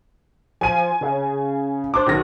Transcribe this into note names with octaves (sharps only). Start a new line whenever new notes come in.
F3 G#5 D#7
C#3
D4 C5 D6
B1 D#3 F#4 A#6